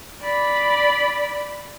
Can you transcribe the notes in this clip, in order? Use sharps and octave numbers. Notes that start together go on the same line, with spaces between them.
D5 B5